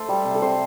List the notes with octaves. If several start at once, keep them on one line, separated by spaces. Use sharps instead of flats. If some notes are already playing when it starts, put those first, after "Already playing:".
Already playing: A3 A4 C5
G3
C3
A4
C3 C5